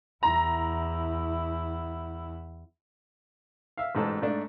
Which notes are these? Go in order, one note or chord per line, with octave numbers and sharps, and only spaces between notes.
E2 E4 A#5
E5 F5
A1 G#2 A4 C5
G#2 A3 D4